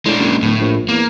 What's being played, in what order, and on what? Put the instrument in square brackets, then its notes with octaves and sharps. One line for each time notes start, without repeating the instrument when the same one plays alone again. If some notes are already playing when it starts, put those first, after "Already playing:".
[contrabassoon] A2 [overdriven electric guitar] G#3 D4
[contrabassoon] F#1
[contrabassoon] D1 [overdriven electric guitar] A2
[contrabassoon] A#1
[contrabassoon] E2 [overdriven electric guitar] A#3